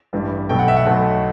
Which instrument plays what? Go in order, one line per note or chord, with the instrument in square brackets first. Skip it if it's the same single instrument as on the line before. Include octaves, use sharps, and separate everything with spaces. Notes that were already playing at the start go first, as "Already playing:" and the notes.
[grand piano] A1 G2 E3 G3
B1 B2 F#3 A3 G5
F#5
E5
F#5
B1 B2 F#3 A3